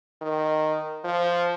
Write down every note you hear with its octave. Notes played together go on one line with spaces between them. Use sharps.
D#3
F3